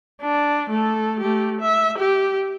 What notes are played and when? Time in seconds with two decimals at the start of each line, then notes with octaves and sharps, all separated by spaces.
0.22 D4
0.70 A3 A4
1.20 A3 G4
1.61 E5
1.98 G4